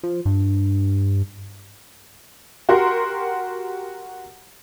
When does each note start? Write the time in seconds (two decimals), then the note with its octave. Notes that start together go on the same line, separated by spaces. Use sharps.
0.03 F3
0.25 G2
2.69 F#4 G4 A#4 F#5 C6